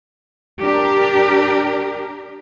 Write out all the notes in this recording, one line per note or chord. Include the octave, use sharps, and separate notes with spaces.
D4 G4 A#4